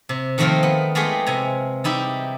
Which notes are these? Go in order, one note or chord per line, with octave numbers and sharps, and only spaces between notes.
C3
D#3 F3 A3 A#3 C4 F4
B3
G#3 A3 B3 F4 G4 G#4
C3 G#5 A#5
G3 D#4 E4 G4